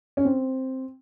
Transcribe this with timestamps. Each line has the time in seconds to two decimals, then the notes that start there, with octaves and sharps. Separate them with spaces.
0.17 C#4
0.25 C4